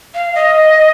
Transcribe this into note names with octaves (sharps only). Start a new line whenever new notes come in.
F5
D#5